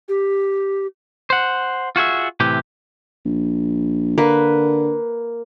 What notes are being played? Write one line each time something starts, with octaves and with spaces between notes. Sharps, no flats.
G4
C5 F#5
F4 F#4 G#4 E5
A2 C3 E3 G4
A#1
D3 A#3 B4